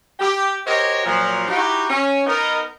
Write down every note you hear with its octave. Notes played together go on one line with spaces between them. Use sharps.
G4
F#4 G4 A#4 C5 C#5 D#5
A#2 F3 F#3
D#4 E4 F#4 G4
C#4
B3 D#4 A#4